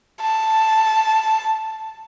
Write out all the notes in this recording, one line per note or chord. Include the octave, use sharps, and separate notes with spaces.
A5